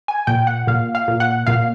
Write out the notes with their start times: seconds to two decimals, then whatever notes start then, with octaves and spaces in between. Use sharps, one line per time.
0.08 G#5
0.27 A#2 G5
0.47 F#5
0.67 A#2 F5
0.95 F5
1.08 A#2
1.20 F#5
1.47 A#2 F5